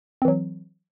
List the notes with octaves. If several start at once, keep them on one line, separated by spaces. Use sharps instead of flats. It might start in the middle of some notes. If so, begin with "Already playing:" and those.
E3 F#3 C4